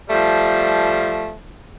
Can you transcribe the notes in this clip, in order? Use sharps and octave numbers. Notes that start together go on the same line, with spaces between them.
F3 G3 A3